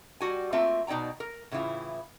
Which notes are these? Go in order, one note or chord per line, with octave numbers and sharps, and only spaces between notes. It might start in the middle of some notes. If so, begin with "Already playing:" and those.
G3 F#4 G#5
A3 A#3 C4 F4 E5
B2 D#4 D5 G5 A#5
A#4
A2 C#3 E3 E4 F4